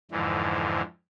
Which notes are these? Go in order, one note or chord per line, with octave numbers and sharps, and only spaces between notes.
F2 G#2 D3 E3